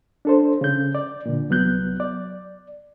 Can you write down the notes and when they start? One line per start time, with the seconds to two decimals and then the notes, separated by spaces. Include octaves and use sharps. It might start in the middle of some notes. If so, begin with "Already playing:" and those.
0.25 D4 A4 C5
0.61 C#3 G6
0.95 D5
1.26 A#2 D3
1.50 C2 F#3 B3 F#6 G6
2.00 D5